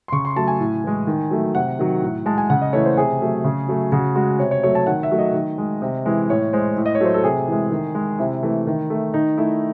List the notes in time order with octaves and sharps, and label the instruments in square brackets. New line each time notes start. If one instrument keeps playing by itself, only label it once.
[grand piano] C6
C#3 C#6
C6
F#3 A3 A5
G#5
A2
E3 G#3
D#3
F#3 A3
C3 F#5
D#3 F#3
A2
G#3 A5
G#5
C#3 F#5
D#5
E3 A3 C#5
C5
C3 G#4
F#3 A3
C#3
F#3 A3
C#3 F#4
G#3 F#4
C3 C#5
C#5
F#3 A3 C#5
A5
D#3 F#5
E5
F#3 A3
D#5
D#3
G#3
C3
E3 G#3
A2 C#5
G#3 C5
A2
D#5
C#5
F#3 A3 C5
A4
C3 G#4
E3 G#3
D#3
G#3
C3 E4
E3 A3
D#3
A3
D#3 D#4
A3 E4